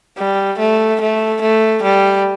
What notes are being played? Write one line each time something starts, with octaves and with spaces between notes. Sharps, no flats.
G3
A3
A3
A3
G3